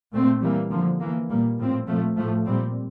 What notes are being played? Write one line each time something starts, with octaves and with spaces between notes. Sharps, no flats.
A#2 A3 C4
E3 G3 A#3
D3 F3 A#3
E3 A#3
A#2 G3 A#3
A2 F3 C4
A#2 F3 A3
A2 F3 A3
A#2 G3 C4